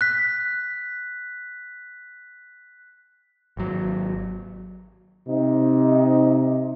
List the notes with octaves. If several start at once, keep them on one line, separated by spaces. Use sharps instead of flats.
F#6 B6
G#1 F#3
C3 D#4